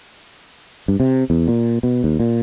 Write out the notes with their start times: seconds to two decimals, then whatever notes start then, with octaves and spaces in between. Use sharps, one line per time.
0.88 G2
1.00 C3
1.30 E2
1.48 A#2
1.83 B2
2.04 D#2
2.20 A#2